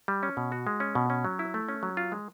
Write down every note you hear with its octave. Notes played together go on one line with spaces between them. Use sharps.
G3
C#4
B2
F#4
G#3
C#4
B2
C#4
F#3
E4
A3
C#4
F#3
F4
G#3